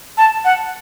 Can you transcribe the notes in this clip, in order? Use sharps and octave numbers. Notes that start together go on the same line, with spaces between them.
A5
F#5